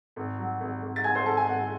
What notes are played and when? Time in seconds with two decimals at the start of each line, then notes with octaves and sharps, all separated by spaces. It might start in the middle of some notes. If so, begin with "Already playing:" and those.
0.16 G#1
0.38 F#3
0.61 G#1
0.82 G#1
0.96 A6
1.04 G#1 G#5 G#6
1.15 C5 C6
1.25 G#1 A4 A5
1.37 G#5
1.47 G#1 F#5